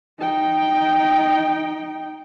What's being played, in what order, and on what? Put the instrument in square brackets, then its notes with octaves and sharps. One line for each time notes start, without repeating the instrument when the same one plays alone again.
[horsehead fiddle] D#4 G5